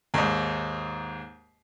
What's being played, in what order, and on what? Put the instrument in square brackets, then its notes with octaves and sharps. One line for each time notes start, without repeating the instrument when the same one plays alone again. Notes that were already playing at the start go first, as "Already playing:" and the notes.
[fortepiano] D#2 G#2